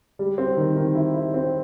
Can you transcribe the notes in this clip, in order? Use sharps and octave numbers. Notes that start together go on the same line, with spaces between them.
G3
C4
D#3
D#3
E4
E4
C4